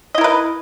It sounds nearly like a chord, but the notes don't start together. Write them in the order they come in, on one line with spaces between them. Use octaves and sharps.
D#5 E4 A#4 B4